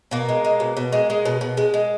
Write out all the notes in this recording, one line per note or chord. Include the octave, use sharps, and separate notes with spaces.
B2 A#3
G#3
G#3
B2
B2
G#3
G#3
B2
B2
G#3
G#3